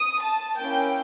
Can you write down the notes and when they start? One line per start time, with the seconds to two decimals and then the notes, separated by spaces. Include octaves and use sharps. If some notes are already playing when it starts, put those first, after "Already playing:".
Already playing: D#6
0.23 A5
0.59 A#3 C#4 E4 G5